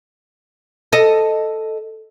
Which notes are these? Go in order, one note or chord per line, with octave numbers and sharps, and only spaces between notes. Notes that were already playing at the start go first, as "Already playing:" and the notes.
A4 D#5